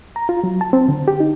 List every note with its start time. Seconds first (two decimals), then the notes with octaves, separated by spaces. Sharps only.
0.16 A#5
0.29 F4
0.44 F#3
0.61 A5
0.73 C4
0.88 D3
1.08 G4
1.20 D#4